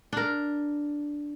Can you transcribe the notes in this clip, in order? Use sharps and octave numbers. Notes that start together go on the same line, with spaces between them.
D4 A#4